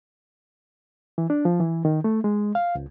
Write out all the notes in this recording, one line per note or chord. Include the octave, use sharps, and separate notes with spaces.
E3
D4
F3
E3
D#3
A3
G#3
F5
C#2